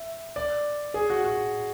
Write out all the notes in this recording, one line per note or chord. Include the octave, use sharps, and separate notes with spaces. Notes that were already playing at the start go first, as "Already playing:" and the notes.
Already playing: E5
D5
G#4
F#4
F#4